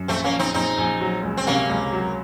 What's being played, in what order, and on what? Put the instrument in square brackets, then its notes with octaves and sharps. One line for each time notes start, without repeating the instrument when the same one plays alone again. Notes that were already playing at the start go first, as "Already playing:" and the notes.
Already playing: [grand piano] F#2
[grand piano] A#1 [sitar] A3 C4
[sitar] A#3 C#4
[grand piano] A#1
[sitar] C4 D#4
[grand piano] A#1 [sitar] C4 D#4
[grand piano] A#1
F#3
C#2
[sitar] C4
[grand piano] C3 [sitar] A#3 C#4
[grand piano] C#2
F#3